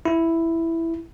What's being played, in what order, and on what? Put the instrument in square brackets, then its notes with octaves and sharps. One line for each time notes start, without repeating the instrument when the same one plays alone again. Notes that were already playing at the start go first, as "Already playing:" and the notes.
[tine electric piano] E4